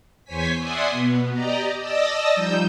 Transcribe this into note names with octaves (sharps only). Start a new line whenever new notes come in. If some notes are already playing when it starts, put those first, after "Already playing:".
E2 C5 C#5 G#5 B6
D5 E5 F#5 G#5 C6 D#6
B2 B3
G4 D5 D#5 A#5
D5 D#5 A5 D#6 E6 A#6
F3 G3 D#4 E6 G6